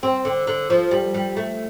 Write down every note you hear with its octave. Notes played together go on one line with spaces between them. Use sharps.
C4
D3
D3
F3
G3
G3
A3